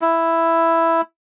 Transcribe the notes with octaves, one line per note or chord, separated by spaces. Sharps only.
E4